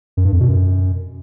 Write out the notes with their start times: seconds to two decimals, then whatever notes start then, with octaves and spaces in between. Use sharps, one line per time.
0.17 F#2
0.25 G2
0.33 F2
0.40 B2
0.48 F#2